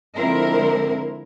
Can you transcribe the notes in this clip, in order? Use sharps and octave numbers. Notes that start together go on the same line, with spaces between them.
D3 F3 G#3 C4 E4 A#4